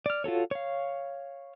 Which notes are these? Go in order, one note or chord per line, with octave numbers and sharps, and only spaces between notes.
D5 F6
F4 F#4 A4 C#5
C#5 F5